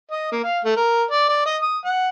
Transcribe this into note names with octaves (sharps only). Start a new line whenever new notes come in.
D#5
A#3
F5
A3
A#4
D5
D5
D#5
D#6
F#5